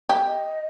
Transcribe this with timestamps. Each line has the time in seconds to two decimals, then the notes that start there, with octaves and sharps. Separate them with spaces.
0.09 G4
0.25 D#5